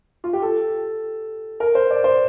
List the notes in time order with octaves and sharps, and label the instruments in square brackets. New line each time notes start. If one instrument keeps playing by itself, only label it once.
[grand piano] F4
G4
A4
A#4
C5
D5
C5